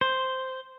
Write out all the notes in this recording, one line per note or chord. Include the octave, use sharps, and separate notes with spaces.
C5